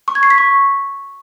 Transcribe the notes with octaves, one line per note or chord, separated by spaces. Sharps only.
C#6
G#6
C7
B6
C#6